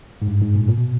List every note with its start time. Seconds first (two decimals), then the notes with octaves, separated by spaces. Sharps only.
0.22 G#2
0.28 G2
0.42 G#2
0.55 A#2
0.68 A#2
0.78 B2